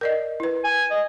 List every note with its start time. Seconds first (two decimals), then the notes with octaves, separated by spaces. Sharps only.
0.01 A#4 D5 D#5
0.40 E4 B4
0.64 G#5
0.90 D#5